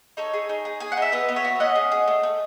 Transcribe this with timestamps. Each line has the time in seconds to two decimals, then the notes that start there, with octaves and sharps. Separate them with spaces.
0.17 D#4 A4 C#5
0.33 G#4
0.49 D#4
0.65 G#4
0.80 G#4 G#5
0.92 F#5
0.97 D#4 E5
1.12 B3 B4 D#5
1.28 B3
1.36 C#5 E5
1.44 F#4
1.60 C#4 D#5 F#5
1.75 G#4
1.92 G#4
2.07 A3
2.23 A3